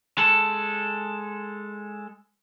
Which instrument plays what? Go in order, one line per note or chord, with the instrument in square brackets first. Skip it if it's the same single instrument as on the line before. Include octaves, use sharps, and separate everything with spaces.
[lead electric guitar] G#3 A4